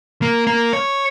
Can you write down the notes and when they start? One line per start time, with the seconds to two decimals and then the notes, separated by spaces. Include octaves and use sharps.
0.22 A#3
0.47 A#3
0.73 C#5